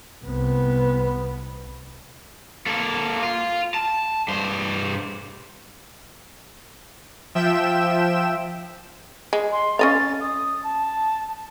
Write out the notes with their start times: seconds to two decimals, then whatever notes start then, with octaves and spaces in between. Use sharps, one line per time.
0.25 C2 B3
2.66 A#3 A4
3.23 F4
3.74 A5
4.28 G2 C5
7.35 F3 E5 G5 E7
9.33 G#3
9.52 C6
9.79 C#4 D#5 F5 A6
10.21 D#6
10.64 A5